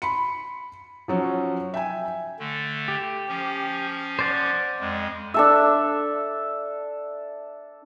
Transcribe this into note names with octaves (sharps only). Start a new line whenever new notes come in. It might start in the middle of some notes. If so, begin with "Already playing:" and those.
B5 C6 C#7
F3 F#3 C#4
E5 G5 G#5
D3 A3
G4
F3 C#4
C5 D5 F#5
F2 G#3
D4 A4 E5